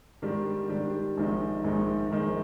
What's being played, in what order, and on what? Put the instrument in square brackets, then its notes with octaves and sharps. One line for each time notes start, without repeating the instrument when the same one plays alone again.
[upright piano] G#2 D#3 G3 D4 G4
G#2 D#3 G3 D4 G4
A#1 G#2 D#3 G#3 D#4
A#1 G#2 D#3 G#3 D#4
A#1 G#2 D#3 G#3 D#4